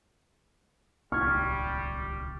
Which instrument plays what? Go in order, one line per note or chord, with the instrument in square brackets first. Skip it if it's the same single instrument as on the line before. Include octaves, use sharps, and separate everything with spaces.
[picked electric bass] D1 C2 [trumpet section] G3 [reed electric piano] C#6 G#6 [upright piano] F6